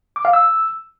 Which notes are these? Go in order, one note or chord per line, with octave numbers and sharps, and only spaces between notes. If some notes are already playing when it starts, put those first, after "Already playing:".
D6
F5
E6